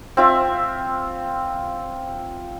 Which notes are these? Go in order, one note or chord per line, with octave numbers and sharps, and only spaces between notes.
C4 F4 E5